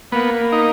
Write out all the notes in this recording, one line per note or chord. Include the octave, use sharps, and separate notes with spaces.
A#3 B3
D#4